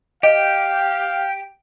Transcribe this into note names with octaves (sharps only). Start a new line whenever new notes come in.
G4 D#5 F5 G5